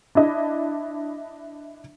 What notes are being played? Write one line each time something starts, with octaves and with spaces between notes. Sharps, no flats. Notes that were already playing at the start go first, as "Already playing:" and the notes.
D4 E4 D#5